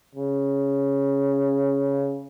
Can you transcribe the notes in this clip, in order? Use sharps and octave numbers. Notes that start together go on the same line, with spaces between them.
C#3